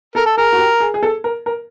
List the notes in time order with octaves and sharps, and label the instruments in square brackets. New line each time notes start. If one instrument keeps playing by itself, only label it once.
[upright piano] A4 [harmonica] A#4
[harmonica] A4
[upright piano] G#4 [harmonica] A#4
[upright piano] F#4
G4
G#4
G#4
A4
A#4
A#4